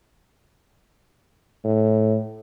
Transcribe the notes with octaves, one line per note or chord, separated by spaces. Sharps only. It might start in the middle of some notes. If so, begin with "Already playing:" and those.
A2